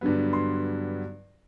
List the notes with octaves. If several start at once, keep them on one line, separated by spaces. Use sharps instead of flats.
G2 D3 F#3 B3
C6